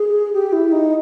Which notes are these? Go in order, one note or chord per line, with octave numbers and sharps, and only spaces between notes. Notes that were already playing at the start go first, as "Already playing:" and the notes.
Already playing: G#4
G4
E4
D#4